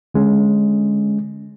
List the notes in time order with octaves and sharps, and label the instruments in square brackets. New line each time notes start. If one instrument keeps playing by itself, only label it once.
[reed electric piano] D3 G#3 C#4